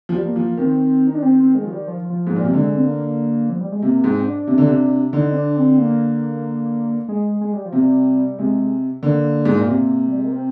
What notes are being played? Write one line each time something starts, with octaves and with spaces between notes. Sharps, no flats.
F3
G3
A#3
F3
D#3 C4
D#4
D4
C4
C4
G#3
F3
G3
F3
F3
G#2
F3
A#2
C3
D3 G#3
C4
A#3
F3
G3
G#3
C3 A#3
G#2 C4
C4
D4
C3
D3
C3
D3 D#4
C4
D4
C4
A#3
G#3
G#3
G3
F3
C3
G3
C3 G#3
D3 A#3
G#2
A#2
C3
G3
G#3
A#3
C4